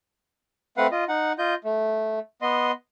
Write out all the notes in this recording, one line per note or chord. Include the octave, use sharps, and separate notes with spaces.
A3 C4 B4 F5 F#5
F4 D#5
D#4 F#5
F4 D#5 G6
A3
B3 D#5 C6